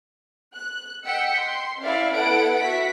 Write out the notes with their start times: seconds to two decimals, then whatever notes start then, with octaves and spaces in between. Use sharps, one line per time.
0.53 F#6
1.05 D#5 F#5 G5 E6 B6 C#7
1.41 C6
1.81 C#4 E4 D5 E5 F5
2.14 B3 E4 A4 B4 F#5 D7
2.59 F#4 E5 B6